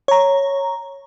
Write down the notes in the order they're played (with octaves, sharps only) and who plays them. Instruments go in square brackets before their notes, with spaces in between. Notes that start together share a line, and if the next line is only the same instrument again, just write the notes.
[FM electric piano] C#5 A#5